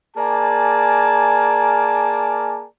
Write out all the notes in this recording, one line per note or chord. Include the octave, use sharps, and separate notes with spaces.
A#3 G#4 A#4 D5 G#5 A5